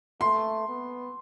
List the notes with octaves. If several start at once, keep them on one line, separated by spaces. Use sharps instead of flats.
A3 C6
B3